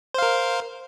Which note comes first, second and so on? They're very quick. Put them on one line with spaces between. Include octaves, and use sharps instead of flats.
C5 F5 A#4